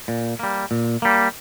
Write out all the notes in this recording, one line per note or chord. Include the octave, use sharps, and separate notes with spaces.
A#2
G3 A#3
A#2
G3 A#3